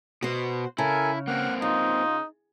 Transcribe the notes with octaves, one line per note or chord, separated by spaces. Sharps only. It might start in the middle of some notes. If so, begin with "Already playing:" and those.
B2 B3 F#4 C5
C#3 E4 A4 A#4 G#5
A#3 C4 F#5 F6
C#3 D#4 F4